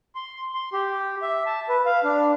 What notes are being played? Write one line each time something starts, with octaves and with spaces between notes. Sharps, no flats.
C6
C6
G4
E5
A5
B4
F5
D4